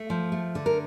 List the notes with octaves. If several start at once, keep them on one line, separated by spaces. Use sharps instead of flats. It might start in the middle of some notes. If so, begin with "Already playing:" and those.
Already playing: A3
F3
A3
D3
A#4